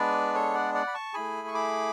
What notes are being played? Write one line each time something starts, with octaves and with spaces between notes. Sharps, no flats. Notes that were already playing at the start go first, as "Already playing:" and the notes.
Already playing: G#3 B3 D4 B4 D5
A4 C#5
D5 F#5
D5 F#5
B5
A5 C#6
A3 E4 G#4 G#5 B5
C#6
B5 D6